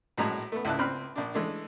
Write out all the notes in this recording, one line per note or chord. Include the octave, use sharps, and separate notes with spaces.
A#1 A2 F#3 G#3 A#5
A3 B3
C#2 A2 C#3 E4 A5 F#6
C#2 C4 B5 F6 F#6
A#1 D4
E3 G#3 A3 D4